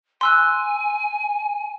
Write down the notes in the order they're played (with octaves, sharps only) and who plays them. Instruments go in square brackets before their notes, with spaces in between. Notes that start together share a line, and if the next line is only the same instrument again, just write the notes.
[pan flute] G#5 [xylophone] C6 E6 F#6